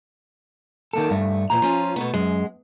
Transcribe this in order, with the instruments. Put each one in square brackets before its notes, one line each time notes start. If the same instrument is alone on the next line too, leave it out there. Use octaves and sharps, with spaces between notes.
[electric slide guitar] D#3 A#3 A4
G2 A3
[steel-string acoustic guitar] E2 A#2 F3 [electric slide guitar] A#5
[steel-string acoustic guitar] F3 C#4 F4
B2 A3 B3
[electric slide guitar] F#2 [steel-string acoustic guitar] G#3